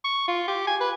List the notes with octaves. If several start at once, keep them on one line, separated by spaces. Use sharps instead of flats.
C#6
F4
G4
G#5
B4